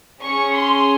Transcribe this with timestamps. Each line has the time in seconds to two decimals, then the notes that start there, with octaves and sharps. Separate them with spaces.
0.23 C#4 G#4 C#6
0.55 C6